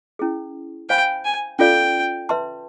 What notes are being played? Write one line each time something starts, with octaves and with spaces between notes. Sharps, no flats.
C#4 E4 G#4
C5 F5 G5 G#5 B5
G#5
C#4 F4 A4 D5 F5 G5
B4 E5 A5 C6